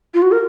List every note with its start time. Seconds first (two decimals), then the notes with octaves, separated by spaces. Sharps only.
0.14 F4
0.22 F#4
0.32 A#4